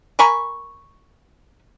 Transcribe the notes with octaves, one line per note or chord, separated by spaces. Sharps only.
A#4 G#5 B5 C#6